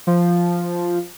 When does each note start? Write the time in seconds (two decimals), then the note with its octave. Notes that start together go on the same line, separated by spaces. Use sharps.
0.07 F3